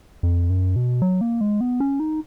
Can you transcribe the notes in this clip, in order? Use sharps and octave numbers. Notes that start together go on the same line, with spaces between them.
F2
F#2
B2
F#3
A#3
G#3
B3
C#4
D#4